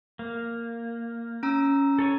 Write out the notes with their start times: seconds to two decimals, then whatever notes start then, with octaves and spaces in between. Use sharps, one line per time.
0.19 A#3
1.43 C#4 A#5 E6
1.99 A4 C#5 G#5